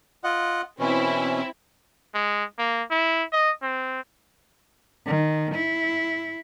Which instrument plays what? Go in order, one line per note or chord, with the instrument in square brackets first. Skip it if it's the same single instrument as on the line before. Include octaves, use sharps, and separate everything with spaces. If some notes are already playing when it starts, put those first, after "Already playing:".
[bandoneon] F4 D#5 F#5
[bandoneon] B2 E3 C#4 [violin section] C4 E4 E5
[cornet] G#3
A#3
E4
D#5
C4
[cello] D#3
E4